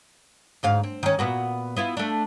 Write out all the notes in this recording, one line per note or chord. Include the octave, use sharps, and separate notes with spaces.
D2 G#2 F5
C4
D#3 C#4
A#2 B3 F#4
B3 E4 F4
A3 D4